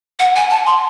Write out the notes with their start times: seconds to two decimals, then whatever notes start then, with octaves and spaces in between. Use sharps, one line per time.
0.19 F#5
0.36 G#5
0.51 A5
0.66 C6